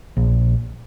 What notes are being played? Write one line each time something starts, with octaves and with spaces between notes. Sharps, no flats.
A#1